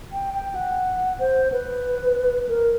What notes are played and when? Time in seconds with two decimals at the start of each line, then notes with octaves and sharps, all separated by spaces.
0.13 G5
0.34 G5
0.55 F#5
1.19 C5
1.52 B4
2.49 A#4